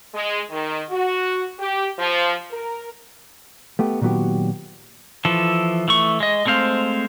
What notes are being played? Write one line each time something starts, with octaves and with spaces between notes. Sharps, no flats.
G#3
D#3
F#4
G4
F3
A#4
A3 B3 G4
A#2 D#3 F#3 B3 F#4 G4
E3 F3 A4
E3 A3 C#6
G#3 D#5
G#3 A3 C4 C5 F5